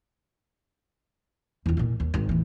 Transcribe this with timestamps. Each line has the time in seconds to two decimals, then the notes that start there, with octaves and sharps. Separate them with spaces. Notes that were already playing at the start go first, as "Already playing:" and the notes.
1.66 E2 F4
1.77 F2 A#2
2.00 D#2
2.14 G#1 G#2
2.29 A1 E3